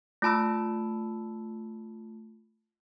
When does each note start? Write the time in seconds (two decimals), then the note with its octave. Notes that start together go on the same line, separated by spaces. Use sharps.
0.22 A3 F4 A5 B5 E6